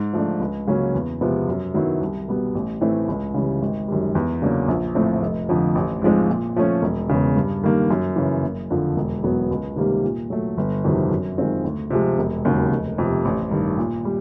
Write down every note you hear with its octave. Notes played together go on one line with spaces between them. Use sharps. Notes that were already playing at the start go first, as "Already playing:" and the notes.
Already playing: G#2
F3 A3 D4
C#2
C#3 F#3 A#3 C#4
E2
C3 F3 G#3 B3
F#2
D#3 F#3 B3 E4
C2
B2 G3 B3
A1
A2 E3 A3 C4
C#2
C#3 E3 G3
G#1
F#2 D#3 G3
E2
C#3 F#3 A#3 D4
A#1
A2 F3 A3 C4
F1
F2 D3 F3
A1
G#2 F3 G#3 C4
A#2
F3 A3 C#4
E1
E2 C#3
G2
D#3 G3 A#3
F#2
C#3 E3
F#1
F2 D3 F3
E1
E2 B2 F#3 B3
C#2
C3 D#3 G3 A#3
A#2
F#3 A3
G1
F2 C3 D#3 F#3
F#2
D#3 G#3 C4 F4
D2
C3 F3 G#3
E1
D#2 C#3 F#3
F1
F2 C3
A1
G2 D#3
A#2
G3